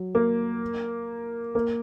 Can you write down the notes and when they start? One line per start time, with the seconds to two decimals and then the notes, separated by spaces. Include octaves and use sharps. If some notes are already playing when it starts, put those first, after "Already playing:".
Already playing: F#3
0.15 A#3
1.55 A#3